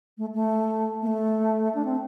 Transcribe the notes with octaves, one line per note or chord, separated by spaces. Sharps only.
A3
A3
A#3
A3
D4
C4